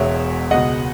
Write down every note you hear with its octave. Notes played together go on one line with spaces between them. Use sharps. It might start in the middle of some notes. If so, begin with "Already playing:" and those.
Already playing: E1 E2 B2 G#3 C#5 E5
C#2 B2 G#3 D#5 F#5